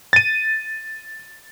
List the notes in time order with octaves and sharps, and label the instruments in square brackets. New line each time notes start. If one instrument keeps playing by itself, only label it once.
[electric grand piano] A6 D#7